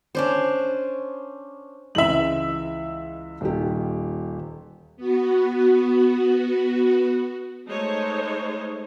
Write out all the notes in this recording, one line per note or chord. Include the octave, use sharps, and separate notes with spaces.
C#4 D4 C5
C#2 E3 G#3 E5 F#7
D#1 D#3 G4
B3 F#4
G#3 A3 D#4 C5 C#5